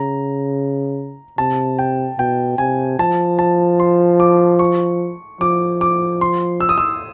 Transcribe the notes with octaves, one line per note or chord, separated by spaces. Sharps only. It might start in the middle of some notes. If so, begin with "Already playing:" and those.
Already playing: C#3 A#5
C3 A5
G5
B2 G5
C3 G#5
F3 A5
A5
C6
D6
C#6
F3 D6
D6
C6
E6
D#6
E6